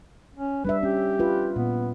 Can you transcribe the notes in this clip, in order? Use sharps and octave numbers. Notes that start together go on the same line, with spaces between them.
C#4
G3 D4 B4 E5
C#4 G4
F4 B4
A#2 B3